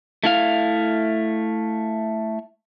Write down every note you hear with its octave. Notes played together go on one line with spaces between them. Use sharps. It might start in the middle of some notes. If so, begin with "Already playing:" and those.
A3 E4 F5